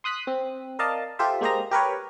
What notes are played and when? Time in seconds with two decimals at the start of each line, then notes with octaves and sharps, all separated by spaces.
0.04 C6 D#6 F#6 B6
0.27 C4
0.79 A#4 D5 D#5 F5 A5
1.19 F4 G4 A4 C5 E5
1.41 G#3 A#3 G4 C5 D#5 A#5
1.71 G4 A#4 B4 C#5